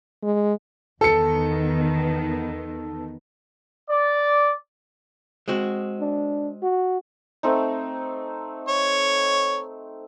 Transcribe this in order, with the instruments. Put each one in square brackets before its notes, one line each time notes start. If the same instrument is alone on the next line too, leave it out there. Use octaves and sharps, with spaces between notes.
[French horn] G#3
[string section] E2 D#3 B3 [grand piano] A4 C#7
[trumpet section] D5
[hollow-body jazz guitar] G#3 C4 F#4
[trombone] D4
F#4
[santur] A3 C4 D#4
[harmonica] C#5